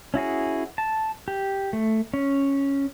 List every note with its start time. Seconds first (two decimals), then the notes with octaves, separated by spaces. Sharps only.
0.14 C#4 E4 F#4 G#4
0.78 A5
1.28 G4
1.73 A3
2.14 C#4